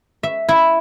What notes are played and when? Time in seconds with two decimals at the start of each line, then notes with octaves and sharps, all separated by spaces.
0.23 E5
0.49 E4